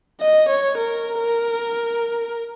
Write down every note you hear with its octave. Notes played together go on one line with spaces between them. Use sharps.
D#5
C#5
A#4
A#4